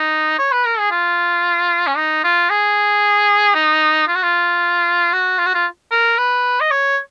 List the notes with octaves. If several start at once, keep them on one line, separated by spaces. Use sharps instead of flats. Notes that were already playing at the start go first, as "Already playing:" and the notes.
Already playing: D#4
C#5
B4
A#4
G#4
F4
C#4
D#4
F4
G#4
D#4
F4
F#4
F4
F#4
F4
F#4
F4
A#4
B4
D#5
C#5